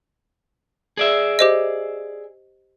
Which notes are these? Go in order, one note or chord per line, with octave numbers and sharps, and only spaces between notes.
G#4 D5 E5
G4 C5 D#5